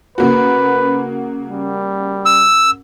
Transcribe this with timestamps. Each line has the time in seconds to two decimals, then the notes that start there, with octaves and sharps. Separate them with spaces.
0.18 C#3 A#3 F#4 B4
1.48 G3
2.26 E6